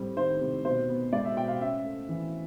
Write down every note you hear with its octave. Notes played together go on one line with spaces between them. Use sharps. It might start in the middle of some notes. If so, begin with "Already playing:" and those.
Already playing: A2 G3 C4
D#3 C5
C3
B2 C5
B3
G#3 D5
E5
B2 G5
F5
C#4 E5
A3
E3